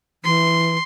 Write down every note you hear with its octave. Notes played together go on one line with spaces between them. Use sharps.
E3 C6